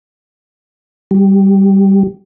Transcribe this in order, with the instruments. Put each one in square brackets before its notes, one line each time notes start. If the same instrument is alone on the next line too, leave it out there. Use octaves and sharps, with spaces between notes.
[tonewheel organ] G3